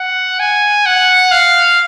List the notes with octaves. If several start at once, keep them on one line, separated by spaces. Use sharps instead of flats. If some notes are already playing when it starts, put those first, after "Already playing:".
Already playing: F#5
G#5
F#5
F5